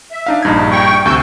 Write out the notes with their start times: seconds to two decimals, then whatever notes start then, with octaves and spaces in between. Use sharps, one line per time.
0.12 E5
0.27 D4 D#4 F5
0.42 A#1 G2 D#4 G#6
0.71 G5 C#6
1.05 D2 C3 F#4 E6 G6